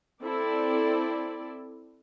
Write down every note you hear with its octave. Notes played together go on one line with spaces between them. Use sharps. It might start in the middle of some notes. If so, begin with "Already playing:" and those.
C4 E4 A4 D5